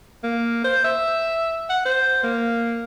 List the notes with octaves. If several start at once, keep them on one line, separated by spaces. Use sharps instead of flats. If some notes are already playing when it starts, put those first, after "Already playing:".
A#3
C5
E5
F#5
C5
A#3